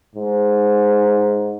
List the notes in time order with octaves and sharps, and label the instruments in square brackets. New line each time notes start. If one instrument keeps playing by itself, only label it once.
[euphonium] G#2